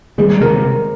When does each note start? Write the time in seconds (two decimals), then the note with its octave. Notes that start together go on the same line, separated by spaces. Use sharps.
0.18 D#3 G3 G#3
0.41 C3 D#3 A#4